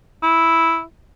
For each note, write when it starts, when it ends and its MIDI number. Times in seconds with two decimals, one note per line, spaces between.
0.23 0.82 64